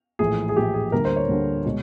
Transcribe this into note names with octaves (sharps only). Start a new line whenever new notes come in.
A#1 A2 E3 G#4
G#4
A#1 A2 E3 G4
G#4
D2 D3 G3 A#3 A#4
C5
C#5
D2 D3 G3 A#3
B2 G#3